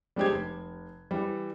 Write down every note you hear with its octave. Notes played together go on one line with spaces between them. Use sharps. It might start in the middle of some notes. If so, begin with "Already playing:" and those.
G3 G#3 D4 G4 C5 G#6
F1
E3 G3